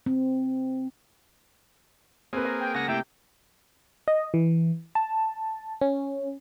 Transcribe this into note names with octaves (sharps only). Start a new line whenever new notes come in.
C4
A#3 C4 G#4 B4
A#4
G5
C#2 C#4 F#5 A#6
C3 A3 A#3 E4 G5
D#5
E3
A5
C#4